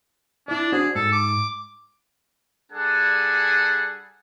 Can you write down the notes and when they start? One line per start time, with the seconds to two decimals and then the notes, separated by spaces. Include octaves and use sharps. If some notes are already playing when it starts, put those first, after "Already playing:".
0.48 D4 E4 D5
0.72 D4 F#4 G#4 C5
0.95 G#2 A4
1.12 D6
2.72 G3 D4 G#4 A4 F#5 G#5